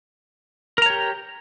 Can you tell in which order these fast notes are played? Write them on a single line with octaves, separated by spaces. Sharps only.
A#4 A#5 C#5 G4